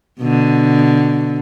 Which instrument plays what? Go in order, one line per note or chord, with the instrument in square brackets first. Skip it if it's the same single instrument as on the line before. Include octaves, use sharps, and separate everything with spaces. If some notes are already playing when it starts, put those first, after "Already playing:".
[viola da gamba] B2 D3